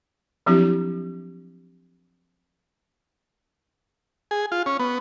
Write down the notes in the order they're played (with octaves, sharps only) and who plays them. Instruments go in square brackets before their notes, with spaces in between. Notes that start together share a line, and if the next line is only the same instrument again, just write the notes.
[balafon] F3 F#3 C4 D4 E4 G4
[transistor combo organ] G#4
F4
C#4
B3